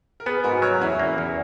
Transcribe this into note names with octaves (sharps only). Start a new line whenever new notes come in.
A#4
B3 G#4 B4
G#2 F#4 A#4
F#3 A#4 C#5
E2 C#4 E4
A#3
E2